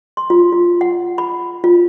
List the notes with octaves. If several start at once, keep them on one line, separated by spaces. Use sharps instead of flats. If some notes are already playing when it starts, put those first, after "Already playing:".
C6
F4
F4
F#5
B5
F4